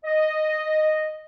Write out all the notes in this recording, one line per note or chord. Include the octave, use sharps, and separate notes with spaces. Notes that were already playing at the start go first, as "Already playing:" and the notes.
D#5